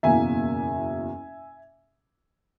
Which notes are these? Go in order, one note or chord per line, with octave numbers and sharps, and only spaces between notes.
F#1 E2 B2 A#3 E5 G#5